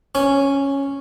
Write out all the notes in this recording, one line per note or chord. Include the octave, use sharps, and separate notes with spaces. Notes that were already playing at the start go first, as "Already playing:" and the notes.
C#4